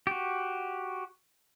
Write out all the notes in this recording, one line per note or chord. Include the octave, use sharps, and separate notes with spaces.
F#4 G4